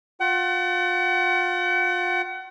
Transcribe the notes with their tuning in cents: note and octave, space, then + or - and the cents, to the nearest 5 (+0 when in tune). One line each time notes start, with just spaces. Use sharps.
F4 +30 F#5 +40